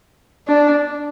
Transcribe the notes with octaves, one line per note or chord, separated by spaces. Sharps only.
D4